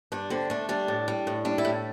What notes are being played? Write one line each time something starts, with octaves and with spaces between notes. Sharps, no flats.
G2 D4
D3 C4
A3 D4
G3 D4
A2
G3
A2
G3 D4
E4
A2